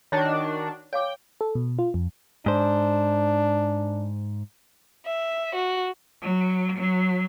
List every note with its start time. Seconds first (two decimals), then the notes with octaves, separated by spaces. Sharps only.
0.12 D#3 D4 F#4 C#5 A5
0.93 C#5 F5 G5 D6
1.41 A4
1.55 B2
1.79 F4
1.94 F2
2.46 G#2 D4 C5
5.07 E5
5.55 F#4
6.22 F#3
6.77 F#3